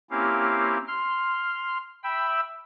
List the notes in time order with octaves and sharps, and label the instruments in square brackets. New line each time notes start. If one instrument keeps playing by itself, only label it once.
[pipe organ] A#3 C4 C#4 E4 G4 F5
C6 F6
E5 G5 B5 E6